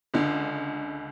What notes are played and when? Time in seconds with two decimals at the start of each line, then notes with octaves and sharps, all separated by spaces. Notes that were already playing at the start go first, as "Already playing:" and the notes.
0.14 C#2 D3